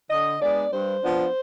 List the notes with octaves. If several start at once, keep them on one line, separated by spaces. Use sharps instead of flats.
D3 D#5
G#3 B3 D4 D5
G2 C5
F3 B3 D4